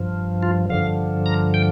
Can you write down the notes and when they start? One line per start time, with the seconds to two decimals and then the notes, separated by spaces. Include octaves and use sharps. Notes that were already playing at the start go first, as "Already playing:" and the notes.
Already playing: G2 F3
0.43 F4
0.70 G2 D3 F3 F5
1.26 A#5
1.54 G5